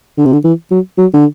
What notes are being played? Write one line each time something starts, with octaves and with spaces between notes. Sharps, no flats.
D3
C3
D3
E3
F#3
F#3
D3